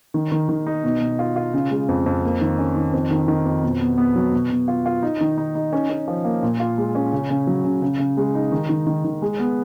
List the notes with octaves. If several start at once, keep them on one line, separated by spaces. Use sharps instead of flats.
D#3
D#3
D#3
D#4
B2
B2
F4
F4
C#3
G#3
F2
F2
A#3
D#3
C#4
D#3
F2
D#3
D#3
F2
B2
B3
B3
F#3
B2
B2
F4
F4
D#4
D#3
D#4
D#4
C#4
C#4
F3
A#3
A#2
F4
G#3
C#4
C#3
C#3
F#3
C#3
C#3
C#3
G#3
D#4
D#3
D#3
D#3
D#3
G#3
B3